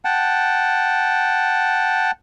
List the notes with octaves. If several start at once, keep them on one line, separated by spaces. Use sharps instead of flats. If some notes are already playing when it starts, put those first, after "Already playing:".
F#5 G5 A5